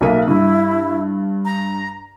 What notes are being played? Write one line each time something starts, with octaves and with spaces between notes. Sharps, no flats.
B1 A#3 E5 D#7
G2 E4
A#5